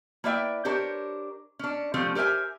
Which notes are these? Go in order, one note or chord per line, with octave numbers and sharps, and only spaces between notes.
A#3 E4 B4 D5 E5 G5
D4 G4 A#4 C5 C#5
C#4 D4
F3 G3 A3 C4 C#4
G4 A#4 C5 E5 G#5